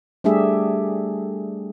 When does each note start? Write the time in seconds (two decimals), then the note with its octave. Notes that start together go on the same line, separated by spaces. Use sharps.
0.24 G3 A3 D4 G4 G#4 E5